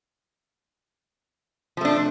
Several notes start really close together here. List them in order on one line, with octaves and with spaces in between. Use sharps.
F3 A3 D4